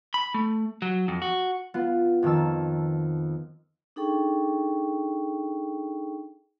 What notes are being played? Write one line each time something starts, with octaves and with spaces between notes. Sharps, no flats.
B5
A3
F#3
F2
F#4
B3 F4
F2 D#3 A5 E6
D4 D#4 G#4 A4 G5 C#6